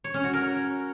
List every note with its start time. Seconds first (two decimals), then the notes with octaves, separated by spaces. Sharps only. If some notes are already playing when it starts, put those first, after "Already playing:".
0.04 C#5
0.14 C#4
0.24 F#4
0.33 A#4